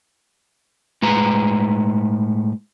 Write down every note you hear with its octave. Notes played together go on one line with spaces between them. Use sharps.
A2 G#3 B4 A#5